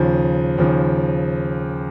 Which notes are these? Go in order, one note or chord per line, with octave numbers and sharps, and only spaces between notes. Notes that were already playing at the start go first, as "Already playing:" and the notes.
Already playing: D#2 C#3 F3
D#2 C#3 F3